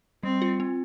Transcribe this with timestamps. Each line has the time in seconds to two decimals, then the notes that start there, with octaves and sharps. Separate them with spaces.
0.23 G3 C4
0.42 F4
0.60 C4